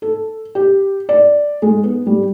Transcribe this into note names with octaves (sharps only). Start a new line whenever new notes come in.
A4
G4
D5
G#3
B3
G3